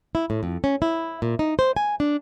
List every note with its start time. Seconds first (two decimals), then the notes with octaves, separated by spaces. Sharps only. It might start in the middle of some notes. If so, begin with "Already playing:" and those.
0.15 E4
0.30 A2
0.43 F2
0.64 C#4
0.82 E4
1.22 A#2
1.39 D#4
1.59 C5
1.76 G#5
2.00 D4